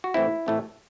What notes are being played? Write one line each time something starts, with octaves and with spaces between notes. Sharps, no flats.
F#4
A2 E3 A3 C4 E4
A2 E3 A3 C4